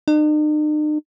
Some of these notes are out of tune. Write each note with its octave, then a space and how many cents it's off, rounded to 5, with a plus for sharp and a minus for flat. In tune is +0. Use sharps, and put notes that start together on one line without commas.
D#4 -45